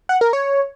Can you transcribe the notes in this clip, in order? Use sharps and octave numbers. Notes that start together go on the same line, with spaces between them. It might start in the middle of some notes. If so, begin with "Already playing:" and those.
F#5
A#4
C#5